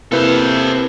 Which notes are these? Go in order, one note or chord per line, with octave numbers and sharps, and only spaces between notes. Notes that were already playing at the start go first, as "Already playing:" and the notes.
C3 A#3 E4 A4 B4 C5